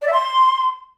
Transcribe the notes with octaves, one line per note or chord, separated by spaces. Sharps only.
D5
E5
C6